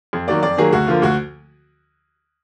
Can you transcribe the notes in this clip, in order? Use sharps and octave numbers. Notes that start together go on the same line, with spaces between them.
F2
D#3 F#3 A#3 D5
F2 D5
D#3 F#3 A#3 G#4
D2 F#4
D3 F3 A#3 F4
D2 F#4